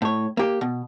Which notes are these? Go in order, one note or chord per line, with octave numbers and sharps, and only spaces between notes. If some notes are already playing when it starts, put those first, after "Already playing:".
A2 C#5
A#3 G4
B2